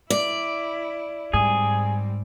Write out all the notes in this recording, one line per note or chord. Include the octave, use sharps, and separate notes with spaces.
E4 D5
G#2 G3 C4 G#4